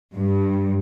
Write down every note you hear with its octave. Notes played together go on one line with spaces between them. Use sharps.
G2